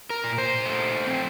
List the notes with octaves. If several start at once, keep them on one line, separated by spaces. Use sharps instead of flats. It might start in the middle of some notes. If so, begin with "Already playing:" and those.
A#4
A#2
C5
A3
C4